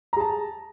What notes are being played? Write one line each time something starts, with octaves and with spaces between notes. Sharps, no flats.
G#4 A5 A#5